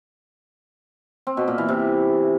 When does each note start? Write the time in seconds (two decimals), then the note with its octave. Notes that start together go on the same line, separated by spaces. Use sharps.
1.27 C4
1.37 B2
1.48 A#2
1.58 E3
1.69 C3